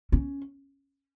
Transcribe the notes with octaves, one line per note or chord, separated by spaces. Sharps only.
C#4